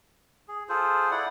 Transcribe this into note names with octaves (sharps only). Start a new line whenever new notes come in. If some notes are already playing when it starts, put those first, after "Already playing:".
G#4
F4 G#4 A4 C5
E4 D5 F#5